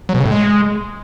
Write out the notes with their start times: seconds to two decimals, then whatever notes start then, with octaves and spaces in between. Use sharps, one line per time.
0.09 F#3
0.15 B2
0.20 C#3
0.26 A2
0.31 G#3